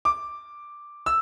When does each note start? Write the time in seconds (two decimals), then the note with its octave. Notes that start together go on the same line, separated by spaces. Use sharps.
0.05 D6
1.06 E6